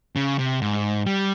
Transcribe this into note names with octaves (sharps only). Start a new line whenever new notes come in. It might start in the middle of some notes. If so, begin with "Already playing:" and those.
C#3
C3
G#2
G3